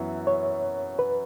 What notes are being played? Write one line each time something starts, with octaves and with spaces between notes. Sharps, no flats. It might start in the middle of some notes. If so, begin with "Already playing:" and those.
Already playing: F#2 E3 B3 F#4 E5
C#5
B4